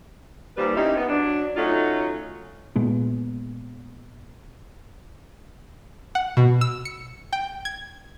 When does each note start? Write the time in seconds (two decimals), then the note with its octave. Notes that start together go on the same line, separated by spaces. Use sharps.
0.57 D#2 A#2 G3 B4 C5
0.75 C4 C#4 D#4 E4 G4
0.97 B3
1.08 F#3 D4
1.57 F#3 A3 C#4 D#4 F4
2.76 A#2 G#3 B3
6.15 F#5
6.37 B2
6.61 E6
6.85 C#7
7.33 G5
7.65 G#6